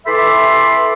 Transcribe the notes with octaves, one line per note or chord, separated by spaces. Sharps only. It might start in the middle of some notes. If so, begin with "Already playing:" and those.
E3 A4 E5 B5 C6 D6